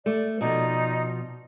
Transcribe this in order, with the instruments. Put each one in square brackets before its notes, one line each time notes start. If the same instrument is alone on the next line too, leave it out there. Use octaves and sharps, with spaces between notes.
[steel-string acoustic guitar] A3 [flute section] D5
[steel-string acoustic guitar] B2 F3 [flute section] D#4 D5